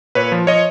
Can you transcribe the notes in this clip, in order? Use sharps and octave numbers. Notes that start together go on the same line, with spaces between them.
A#2 B4 C#5
F3
F3 C#5 D#5